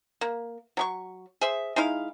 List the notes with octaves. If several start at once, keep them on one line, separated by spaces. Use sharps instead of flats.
A#3
F#3 G#4 C#6
G#4 C5 E5
G#3 D#4 E4 F5